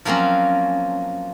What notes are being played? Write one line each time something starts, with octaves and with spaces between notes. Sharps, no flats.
F3 F#3 A#3 C4 C#4